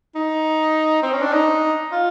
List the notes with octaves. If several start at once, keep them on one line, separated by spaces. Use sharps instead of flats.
D#4
C4
C#4
D4
D#4
F4